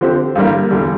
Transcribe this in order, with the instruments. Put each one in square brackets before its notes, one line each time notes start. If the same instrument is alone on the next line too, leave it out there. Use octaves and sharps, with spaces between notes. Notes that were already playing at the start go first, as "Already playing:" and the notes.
[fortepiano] D3 F3 C4 G4
G2 D3 G3 A#3
E2 D3 G3